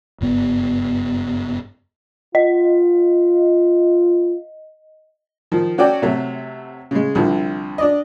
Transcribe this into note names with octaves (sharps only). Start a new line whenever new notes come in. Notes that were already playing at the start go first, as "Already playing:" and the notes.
F#1 G2 B3
F4 D#5
D#3 F3
C#4 F#4 A4 D5 G5
C3 F#3 A3
C#3 G#3
C2 D3 F3
D4 D5 D#5